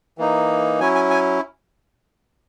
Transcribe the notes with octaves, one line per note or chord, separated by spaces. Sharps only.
E3 A#3 D#4
F#3 C#4 E4 G#5
G#5
G#5